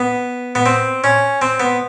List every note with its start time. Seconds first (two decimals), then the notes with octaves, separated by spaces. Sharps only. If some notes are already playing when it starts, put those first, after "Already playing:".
Already playing: B3
0.55 B3
0.66 C4
1.04 C#4
1.42 C4
1.60 B3